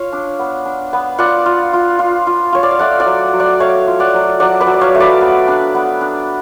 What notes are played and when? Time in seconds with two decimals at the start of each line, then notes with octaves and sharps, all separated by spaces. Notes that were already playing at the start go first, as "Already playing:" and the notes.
Already playing: F4 C#5 F5
0.13 D4
0.39 B3
0.66 D4
0.93 B3
1.19 F4 D5 F#5
1.46 F4
1.73 F4
1.99 F4
2.27 F4
2.52 F4 C#5
2.63 D5
2.71 F5
2.79 A3 D5 F#5
3.00 D5 F#5
3.06 F#3
3.33 F#3
3.39 D5 F#5
3.60 A3 C#5 F5
3.87 F4
4.00 D5 F#5
4.14 F#3
4.40 F#3 D5 F#5
4.60 B4 D5
4.67 F#3
4.74 D5
4.81 C#5 F5
4.95 A3
5.00 B4 D5
5.21 B3
5.48 D4
5.75 B3
6.01 D4